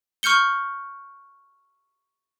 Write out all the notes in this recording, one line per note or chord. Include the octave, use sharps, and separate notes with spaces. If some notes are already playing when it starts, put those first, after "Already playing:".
C#6 F6 G6 C#7 G7